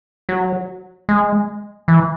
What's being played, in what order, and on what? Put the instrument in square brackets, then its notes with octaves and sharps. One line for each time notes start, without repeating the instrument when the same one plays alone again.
[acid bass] F#3
G#3
E3